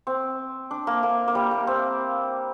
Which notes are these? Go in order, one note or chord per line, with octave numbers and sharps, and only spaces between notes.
C4
D4
A#3
A#3
A#3
G3
A#3
C4